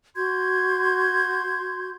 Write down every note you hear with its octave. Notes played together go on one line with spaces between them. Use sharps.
F#4 C6 G6 G#6